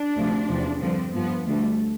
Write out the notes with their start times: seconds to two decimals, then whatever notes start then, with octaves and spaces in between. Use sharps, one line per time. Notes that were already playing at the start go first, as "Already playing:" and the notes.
Already playing: D4
0.16 D2 C3 F3
0.48 E2 C3 F3
0.81 G2 D3 F3 C4
1.15 G2 F3 B3
1.47 D2 D3 G3 A3